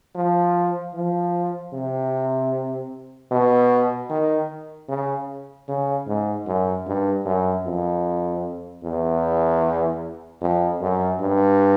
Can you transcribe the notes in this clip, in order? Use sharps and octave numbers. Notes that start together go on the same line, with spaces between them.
F3
F3
C3
B2
D#3
C#3
C#3
G#2
F#2
G2
F#2
F2
E2
F2
F#2
G2